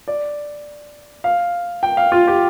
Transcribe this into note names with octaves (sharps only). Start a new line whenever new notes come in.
D5
F5
G5
F5
F4
G4